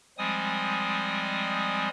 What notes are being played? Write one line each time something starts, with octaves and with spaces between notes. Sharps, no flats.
F3 G3 G#3 C4 G#5 D#6